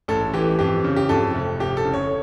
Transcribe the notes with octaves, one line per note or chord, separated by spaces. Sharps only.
A1 A4
E3 G4
F2 G4
C#3
G4
F2 A4
F1
F1 G4
A4
C#3
C#5